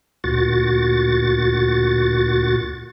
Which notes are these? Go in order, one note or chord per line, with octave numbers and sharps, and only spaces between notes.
D2 A#2 F#4 A6